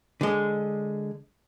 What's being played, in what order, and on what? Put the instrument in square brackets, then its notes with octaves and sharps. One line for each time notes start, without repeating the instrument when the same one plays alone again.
[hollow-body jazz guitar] D3 G#3